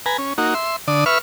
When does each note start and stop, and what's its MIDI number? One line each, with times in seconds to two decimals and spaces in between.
0.06 0.17 71
0.06 0.17 80
0.06 0.17 82
0.18 0.33 61
0.38 0.54 58
0.38 0.54 63
0.38 0.54 66
0.54 0.76 76
0.54 0.76 84
0.88 1.05 50
0.88 1.05 74
0.88 1.05 87
1.06 1.18 71
1.06 1.18 76
1.06 1.18 85
1.06 1.18 89